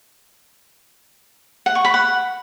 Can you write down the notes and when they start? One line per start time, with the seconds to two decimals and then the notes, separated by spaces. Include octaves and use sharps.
1.66 F#5
1.75 C#6
1.85 B5
1.94 F#5